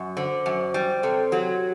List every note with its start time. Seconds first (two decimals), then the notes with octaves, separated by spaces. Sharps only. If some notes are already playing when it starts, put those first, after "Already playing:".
Already playing: F#2
0.17 D3 C5
0.46 F#2
0.74 G3 C5
1.03 C3 A4
1.31 F#3 G4